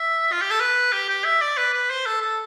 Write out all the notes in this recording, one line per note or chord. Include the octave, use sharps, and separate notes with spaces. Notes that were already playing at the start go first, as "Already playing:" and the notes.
Already playing: E5
F4
G4
A4
B4
G4
G4
E5
D5
B4
B4
C5
A4
A4